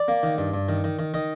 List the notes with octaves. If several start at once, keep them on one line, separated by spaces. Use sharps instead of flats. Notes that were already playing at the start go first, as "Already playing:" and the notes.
Already playing: D5
A#3
D#3
G2
G2
D#3
D#3
D#3
D#3 D#5